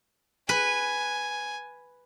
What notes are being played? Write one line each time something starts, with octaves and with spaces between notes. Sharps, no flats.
B4 G#5